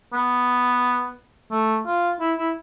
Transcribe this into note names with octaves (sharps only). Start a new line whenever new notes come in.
B3
A3
F4
E4
E4